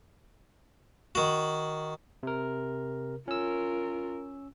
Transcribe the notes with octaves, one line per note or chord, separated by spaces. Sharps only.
D#3 F#4
C3 A#4
C#4 F4 A#4 E6